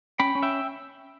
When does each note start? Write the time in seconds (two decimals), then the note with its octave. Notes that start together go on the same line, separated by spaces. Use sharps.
0.20 C#4 G5 B5
0.35 C#4
0.43 E5 G5